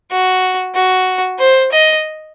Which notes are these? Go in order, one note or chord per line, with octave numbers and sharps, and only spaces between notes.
F#4
F#4
C5
D#5